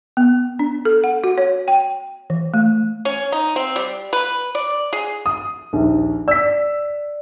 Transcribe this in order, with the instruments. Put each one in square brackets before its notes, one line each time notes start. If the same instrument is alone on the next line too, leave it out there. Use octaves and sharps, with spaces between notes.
[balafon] B3
D4
A4
F#5
F#4
C#5
G5
E3
A3
[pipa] C#4
D#4
C4
G3
B4
D5
G#4
[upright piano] D#6
A#1 D#2
[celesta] D5 [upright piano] E6 B6